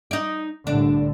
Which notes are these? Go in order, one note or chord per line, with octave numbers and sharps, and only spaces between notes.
D#4 D5
C2 A2 D3 D4